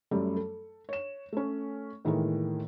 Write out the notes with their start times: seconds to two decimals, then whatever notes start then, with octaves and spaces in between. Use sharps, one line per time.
0.11 F#2 G3 A3
0.36 A4
0.89 C#5 E7
1.32 A3 C#4
2.05 A2 D#3 E3 G#3 A#3